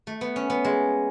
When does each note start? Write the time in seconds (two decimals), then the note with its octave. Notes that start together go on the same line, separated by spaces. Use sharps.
0.07 A3
0.21 B3
0.36 C#4
0.50 B3
0.65 G#3